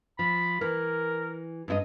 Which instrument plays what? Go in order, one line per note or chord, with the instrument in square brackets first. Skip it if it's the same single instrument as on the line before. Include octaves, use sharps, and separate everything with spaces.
[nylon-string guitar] F3 [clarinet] B5
[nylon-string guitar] E3 [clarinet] A#4
[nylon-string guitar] G2 E4 D#5